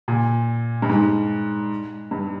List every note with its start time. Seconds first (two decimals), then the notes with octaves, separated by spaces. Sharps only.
0.08 A#2
0.82 G2
0.90 G#2
2.11 G2